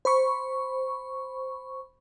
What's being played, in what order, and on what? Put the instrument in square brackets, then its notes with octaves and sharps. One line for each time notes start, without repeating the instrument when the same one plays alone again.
[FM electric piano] C5 B5 C#6